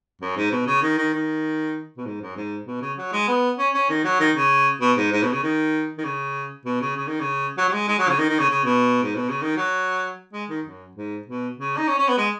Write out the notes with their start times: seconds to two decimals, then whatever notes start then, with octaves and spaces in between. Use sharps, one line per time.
0.21 F#2
0.37 G#2
0.52 B2
0.67 C#3
0.82 D#3
0.98 D#3
1.13 D#3
1.97 B2
2.06 G#2
2.21 F#2
2.36 G#2
2.67 B2
2.82 C#3
2.98 F#3
3.13 G#3
3.28 B3
3.59 C#4
3.74 C#4
3.89 D#3
4.05 F#3
4.20 D#3
4.36 C#3
4.81 B2
4.97 G#2
5.12 G#2
5.23 B2
5.32 C#3
5.43 D#3
5.98 D#3
6.04 C#3
6.66 B2
6.81 C#3
6.96 C#3
7.08 D#3
7.20 C#3
7.58 F#3
7.68 F#3
7.73 G#3
7.88 G#3
7.99 F#3
8.09 C#3
8.19 D#3
8.29 D#3
8.39 C#3
8.50 C#3
8.65 B2
9.03 G#2
9.16 B2
9.29 C#3
9.42 D#3
9.57 F#3
10.33 G#3
10.49 D#3
10.65 F#2
10.96 G#2
11.27 B2
11.57 C#3
11.77 D#4
11.88 C#4
11.98 C#4
12.08 B3
12.18 G#3